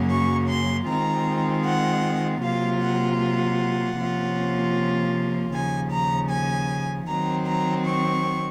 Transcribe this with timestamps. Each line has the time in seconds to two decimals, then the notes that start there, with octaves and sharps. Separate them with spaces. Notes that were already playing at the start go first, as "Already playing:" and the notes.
Already playing: F#2 C#3 F#3 A#3
0.10 C#6
0.49 C6
0.87 D#3 G#3 C4 F4 A#5
1.65 F#5
2.42 C3 F#3 A#3 F4 F5
2.81 F#5
3.20 F#5
3.98 C3 F3 A#3 C#4 F4
5.53 D#2 C#3 F3 G#5
5.91 A#5
6.30 G#5
7.08 D#3 F#3 C4 A#5
7.46 A#5
7.86 C#6